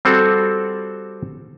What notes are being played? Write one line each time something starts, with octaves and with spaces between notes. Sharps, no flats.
G3 C4 F#4 A4